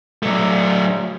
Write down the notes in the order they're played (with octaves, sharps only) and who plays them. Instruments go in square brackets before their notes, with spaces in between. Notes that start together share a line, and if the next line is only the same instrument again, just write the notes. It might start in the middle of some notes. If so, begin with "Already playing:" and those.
[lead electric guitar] F#3 A3